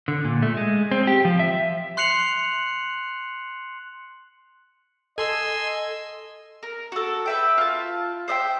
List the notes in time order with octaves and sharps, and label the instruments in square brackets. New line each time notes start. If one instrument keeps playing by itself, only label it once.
[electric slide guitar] D3
A#2
A3
G#3
C4
G4
F3
E5
[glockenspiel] C6 F#6 C7 C#7 F7 F#7
[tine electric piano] A4 [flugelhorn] D#5 [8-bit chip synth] G#5 C6 E6
[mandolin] A#4
F#4 A4
B4 E5 G5
F4 A5
C5 D#5 E5 G5